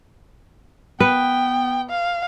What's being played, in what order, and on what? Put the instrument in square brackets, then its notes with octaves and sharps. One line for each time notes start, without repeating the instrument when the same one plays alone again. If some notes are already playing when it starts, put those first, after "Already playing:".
[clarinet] B3 [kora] B4 [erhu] G5
[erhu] F5